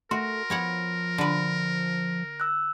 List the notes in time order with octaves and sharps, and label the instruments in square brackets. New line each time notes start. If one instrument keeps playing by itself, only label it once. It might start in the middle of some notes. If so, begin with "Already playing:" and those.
[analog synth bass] A3 [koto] F#4 [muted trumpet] A#4 [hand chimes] C6
[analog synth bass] F3 [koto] B3 C#5 F#5
[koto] D3 B4
[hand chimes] E6 F#6